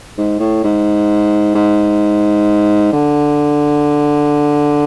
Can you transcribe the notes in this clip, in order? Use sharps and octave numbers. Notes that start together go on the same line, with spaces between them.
G#2
A2
G#2
G#2
D3